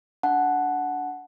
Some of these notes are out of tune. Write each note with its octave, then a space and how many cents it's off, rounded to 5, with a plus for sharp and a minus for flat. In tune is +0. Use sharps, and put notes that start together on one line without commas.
D4 -20 F#5 +0 A5 -20